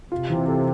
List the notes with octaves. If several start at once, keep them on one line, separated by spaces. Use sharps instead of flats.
C3 F4
E3
A4